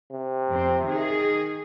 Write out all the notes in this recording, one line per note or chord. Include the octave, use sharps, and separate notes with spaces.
C3
F2 C4
D#3 G#4